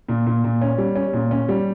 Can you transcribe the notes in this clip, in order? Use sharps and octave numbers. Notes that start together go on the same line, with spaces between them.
A#2
A#2
A#2
C#4
G3
C#4
A#2
C#4
G3